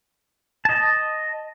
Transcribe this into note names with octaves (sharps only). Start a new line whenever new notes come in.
D#5 A5